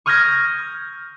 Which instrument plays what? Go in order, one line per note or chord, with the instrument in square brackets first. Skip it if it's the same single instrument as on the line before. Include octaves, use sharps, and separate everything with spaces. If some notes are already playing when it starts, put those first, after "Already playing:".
[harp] C#6 D#6 F6 G6 G#6 A#6